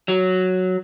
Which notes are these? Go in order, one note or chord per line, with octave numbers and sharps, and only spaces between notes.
F#3